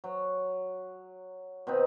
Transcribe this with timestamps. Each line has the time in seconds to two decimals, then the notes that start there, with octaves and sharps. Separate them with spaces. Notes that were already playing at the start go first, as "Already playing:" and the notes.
0.04 F#3
1.67 B2 D#3 C4 D#4